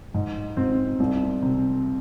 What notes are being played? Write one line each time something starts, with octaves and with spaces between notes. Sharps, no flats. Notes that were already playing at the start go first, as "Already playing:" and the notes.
G#2
G#2 C4
C2
C3